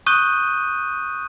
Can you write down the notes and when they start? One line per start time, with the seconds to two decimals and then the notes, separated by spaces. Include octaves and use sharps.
0.06 C#6 D#6 F#6 G6 D#7 G7